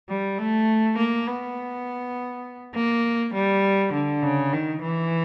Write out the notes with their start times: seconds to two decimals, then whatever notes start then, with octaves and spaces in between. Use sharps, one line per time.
0.09 G3
0.38 A3
0.98 A#3
1.27 B3
2.74 A#3
3.35 G3
3.93 D3
4.22 C#3
4.52 D#3
4.81 E3